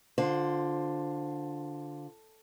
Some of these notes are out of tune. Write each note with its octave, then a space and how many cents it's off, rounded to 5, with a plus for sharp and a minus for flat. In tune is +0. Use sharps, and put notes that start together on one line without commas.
D3 +0 F4 +20 C5 +0